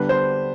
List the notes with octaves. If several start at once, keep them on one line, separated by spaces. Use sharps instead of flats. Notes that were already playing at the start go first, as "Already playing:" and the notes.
Already playing: D3 G3 B3 D4 B4
C5